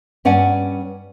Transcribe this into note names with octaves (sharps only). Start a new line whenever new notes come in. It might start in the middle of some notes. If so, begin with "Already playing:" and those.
G2 C#4 D5 F#5 G#5